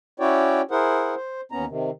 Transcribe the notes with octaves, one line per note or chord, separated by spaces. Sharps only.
C#4 E4 F#4 C#5 D5 G5
E4 G#4 A#4 C5 F#5
C5
D#2 B3 C#4 A#5
C3 D#3